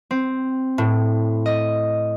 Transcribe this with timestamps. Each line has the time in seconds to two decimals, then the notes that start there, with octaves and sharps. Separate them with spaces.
0.11 C4
0.78 A2
1.46 D#5